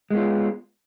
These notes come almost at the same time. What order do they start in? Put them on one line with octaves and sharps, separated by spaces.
G#3 B3 F4